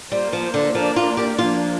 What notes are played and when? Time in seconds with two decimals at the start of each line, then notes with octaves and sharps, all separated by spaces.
0.11 G3 A#3 F4 C5
0.33 F3
0.54 D3
0.75 F3 A#3 D4 A#4 D5
0.96 F4
1.17 G4
1.38 F3 A#3 D4 F4